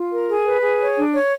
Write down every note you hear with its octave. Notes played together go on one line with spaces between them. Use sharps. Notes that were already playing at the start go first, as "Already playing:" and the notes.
Already playing: F4
A#4
G#4
B4
G#4
C#5
D4
C#5